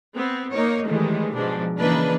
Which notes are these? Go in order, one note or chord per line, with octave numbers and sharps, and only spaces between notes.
B3 C4
A#3 D#4 A#4 C#5
A2 D#3 E3 G3 G#3
G#2 B2 F3 D4
C#3 E3 A#3 D4 D#4 B4